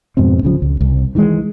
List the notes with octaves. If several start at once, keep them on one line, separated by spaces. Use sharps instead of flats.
F2 G#2 B2 C4
D1 C#3 F3
C#2
C2
D#3 E3 F#3 G#3